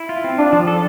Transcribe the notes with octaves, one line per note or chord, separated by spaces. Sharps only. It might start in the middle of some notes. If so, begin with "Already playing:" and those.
Already playing: E4
F4
C4
D4 F4
F3
A4